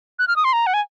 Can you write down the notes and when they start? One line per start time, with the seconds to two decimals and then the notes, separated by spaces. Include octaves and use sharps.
0.19 F#6
0.28 F6
0.36 D#6
0.44 C6
0.53 A#5
0.67 F#5
0.74 G#5